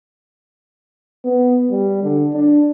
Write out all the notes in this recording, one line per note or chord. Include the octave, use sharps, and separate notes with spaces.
B3
G3
D3
D4